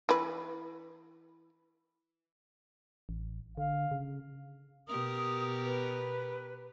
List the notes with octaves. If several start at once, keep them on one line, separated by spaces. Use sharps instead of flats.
E3 B4
A1
D3 F5
C#3
B2 G4 A#4 D#6
B4